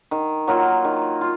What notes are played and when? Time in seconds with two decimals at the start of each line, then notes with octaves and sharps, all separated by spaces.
0.11 D#3
0.47 F#3 A#3 F4
0.85 D#3
1.21 F4